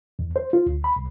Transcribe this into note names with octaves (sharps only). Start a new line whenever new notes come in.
E2
C5
F4
D2
B5
C2